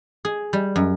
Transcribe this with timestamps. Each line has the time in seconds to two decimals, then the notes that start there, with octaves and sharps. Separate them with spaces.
0.25 G#4
0.53 G3
0.76 F#2